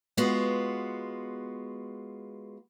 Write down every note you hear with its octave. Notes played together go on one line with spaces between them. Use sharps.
G#3 B3 F4 F#4